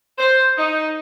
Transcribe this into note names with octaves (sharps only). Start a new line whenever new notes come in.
C5
D#4